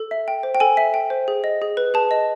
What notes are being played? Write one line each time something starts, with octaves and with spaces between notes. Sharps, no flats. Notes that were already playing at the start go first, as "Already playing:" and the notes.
Already playing: A4
E5
G5
C5
G5
A4 G#5
E5
G5
C5
G#4
D#5
G#4
B4
G#4 A5
D#5